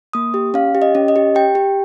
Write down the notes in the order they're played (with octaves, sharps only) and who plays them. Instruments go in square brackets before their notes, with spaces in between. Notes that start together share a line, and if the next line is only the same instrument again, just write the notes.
[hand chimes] A#3 D#6
G4
C#4 F5
G4
D#5
C#4
D#5
G4
G4 G5
G4